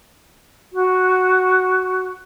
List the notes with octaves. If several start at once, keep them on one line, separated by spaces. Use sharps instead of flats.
F#4